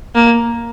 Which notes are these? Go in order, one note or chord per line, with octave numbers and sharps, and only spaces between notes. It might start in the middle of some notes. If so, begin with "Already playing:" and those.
A#3